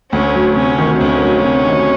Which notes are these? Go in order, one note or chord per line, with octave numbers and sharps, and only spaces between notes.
D2 C#4
F#3
C3 C#4
D#3
D2 C#4
F#3
C3
D#3